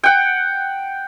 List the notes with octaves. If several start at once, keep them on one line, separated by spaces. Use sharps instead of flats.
F#5 G5